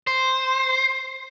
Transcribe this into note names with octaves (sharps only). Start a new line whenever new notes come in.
C5